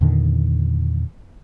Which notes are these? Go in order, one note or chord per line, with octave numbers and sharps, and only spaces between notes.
E2 A#2 D3 D#3